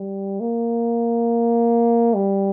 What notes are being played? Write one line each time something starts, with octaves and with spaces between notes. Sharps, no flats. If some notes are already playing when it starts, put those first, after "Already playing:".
Already playing: G3
A#3
G3